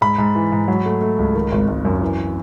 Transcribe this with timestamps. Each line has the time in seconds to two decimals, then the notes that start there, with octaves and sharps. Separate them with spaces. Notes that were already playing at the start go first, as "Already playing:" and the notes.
0.01 G#2 B5
0.18 G#2
0.35 E3
0.52 G#2
0.68 F#3
0.85 A3
1.01 A3
1.18 C#2
1.35 D#3
1.52 G#1
1.68 G#1
1.85 F#2
2.02 E3